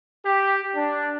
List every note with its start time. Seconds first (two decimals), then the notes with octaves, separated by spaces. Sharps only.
0.25 G4
0.75 D4